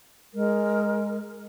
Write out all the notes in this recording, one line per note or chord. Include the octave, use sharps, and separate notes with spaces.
G#3 A#4